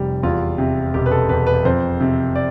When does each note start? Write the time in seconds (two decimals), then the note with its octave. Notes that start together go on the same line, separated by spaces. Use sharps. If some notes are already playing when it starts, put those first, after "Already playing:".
Already playing: F1 G3
0.23 E2 F4
0.58 C3
0.94 E1 G4
1.06 B4
1.11 A4
1.29 E1 B4
1.47 B4
1.65 F2 C5
2.00 C3
2.36 D5